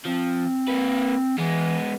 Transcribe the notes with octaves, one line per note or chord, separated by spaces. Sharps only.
F3 C4
A#3 B4
E3 G#3 B3